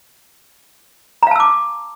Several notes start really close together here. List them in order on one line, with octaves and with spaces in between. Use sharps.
A#5 F5 A5 E6 D6